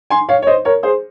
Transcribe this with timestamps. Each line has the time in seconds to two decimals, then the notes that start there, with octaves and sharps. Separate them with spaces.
0.10 G#5 C6
0.29 C#5 F5
0.42 C#5
0.47 C5 D#5
0.65 A#4 C#5
0.83 G#4 C5